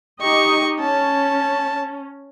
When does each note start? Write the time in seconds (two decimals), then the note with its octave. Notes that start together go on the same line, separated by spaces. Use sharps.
0.22 D#4 G4 D#5 C#6
0.80 C#4 A5